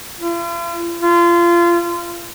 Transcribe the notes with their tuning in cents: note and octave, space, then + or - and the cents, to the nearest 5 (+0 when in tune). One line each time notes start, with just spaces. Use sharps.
F4 -45
F4 -25